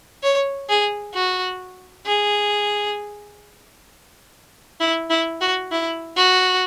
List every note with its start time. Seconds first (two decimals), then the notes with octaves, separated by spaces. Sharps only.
0.23 C#5
0.69 G#4
1.14 F#4
2.06 G#4
4.80 E4
5.10 E4
5.41 F#4
5.71 E4
6.17 F#4